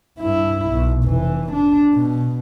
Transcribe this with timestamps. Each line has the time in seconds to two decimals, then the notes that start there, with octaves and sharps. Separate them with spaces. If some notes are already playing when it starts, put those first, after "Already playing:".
0.20 G2 E4
0.70 B1
1.03 F1 E3
1.52 D4
1.93 B2